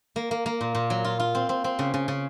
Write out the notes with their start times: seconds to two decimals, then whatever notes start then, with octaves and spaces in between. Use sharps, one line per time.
0.16 A#3
0.31 A#3
0.46 A#3
0.61 A#2
0.75 A#2
0.90 F#3
1.05 F4
1.20 F4
1.35 C4
1.49 C4
1.64 C4
1.79 C#3
1.94 C#3
2.08 C#3